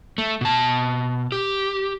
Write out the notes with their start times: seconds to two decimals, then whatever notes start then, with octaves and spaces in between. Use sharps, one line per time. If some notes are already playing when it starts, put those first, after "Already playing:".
0.18 A3
0.41 B2 A5
1.32 G4